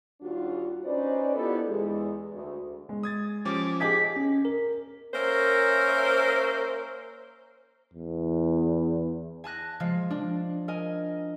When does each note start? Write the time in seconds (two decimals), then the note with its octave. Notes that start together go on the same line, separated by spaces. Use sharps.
0.21 D#2 G3 D4 F4 F#4
0.85 C#4 D#4 B4 C5 D5
1.35 B3 D4 E4 F4 G4 A4
1.68 E2 G#3
2.33 D2
2.89 G#3
3.03 D#6 G#6 A6
3.45 F3 C#4 G4 D6
3.80 G4 G#4 D#5 D6 G6 G#6 B6
4.16 C#4
4.45 A#4
5.14 A#3 C#4 A#4 C5 E5
7.94 E2
9.44 G#5 A5 F#6 A#6
9.80 F3 G#3
10.10 D4
10.68 A#4 D#5 G#5